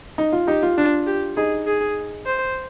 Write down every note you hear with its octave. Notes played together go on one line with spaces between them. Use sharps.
D#4
F4
D#4 G4
F4
D4 F4
G4
D#4 G#4
G#4
C5